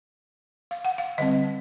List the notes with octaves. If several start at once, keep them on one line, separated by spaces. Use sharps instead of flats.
F5
F#5
F5
D3 G3 C4 D#5